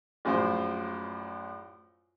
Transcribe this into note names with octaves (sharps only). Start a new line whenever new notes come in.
A#1 F#2 A2 F4 C5